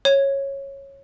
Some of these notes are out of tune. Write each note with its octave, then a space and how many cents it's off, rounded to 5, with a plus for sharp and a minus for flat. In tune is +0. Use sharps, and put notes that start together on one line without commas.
C#5 -15